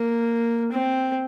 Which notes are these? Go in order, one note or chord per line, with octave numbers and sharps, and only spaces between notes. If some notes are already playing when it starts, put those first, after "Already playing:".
Already playing: A#3
C4